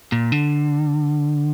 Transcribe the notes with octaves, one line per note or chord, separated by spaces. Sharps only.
A#2
D3